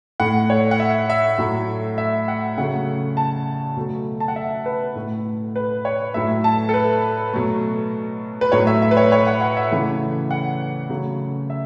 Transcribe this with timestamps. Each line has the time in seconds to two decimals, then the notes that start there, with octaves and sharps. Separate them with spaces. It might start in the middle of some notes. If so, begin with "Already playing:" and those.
0.20 A2 A3 F#5
0.50 C#5
0.71 F#5
0.80 E5
1.10 E5
1.38 A2 F#3 A3
1.98 E5
2.28 F#5
2.58 C#3 F#3 A3 F#5
3.17 A5
3.76 B2 F#3 A3
4.20 A5
4.28 F#5
4.36 E5
4.66 B4
4.96 A2 A3
5.56 B4
5.85 C#5
6.14 A2 F#3 A3 E5
6.44 A5
6.69 A4
6.74 B4
7.33 B2 F#3 A3
8.41 B4
8.52 A2 F#3 A3 C#5
8.67 E5
8.82 E5
8.91 B4
8.97 C#5
9.12 C#5
9.27 F#5
9.41 F#5
9.57 E5
9.71 C#3 E3 A3
10.31 F#5
10.90 C#3 F#3 A3
11.50 E5